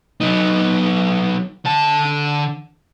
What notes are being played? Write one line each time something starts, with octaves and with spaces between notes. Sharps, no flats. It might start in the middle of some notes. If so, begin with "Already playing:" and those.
F#3 D#4
D3 A5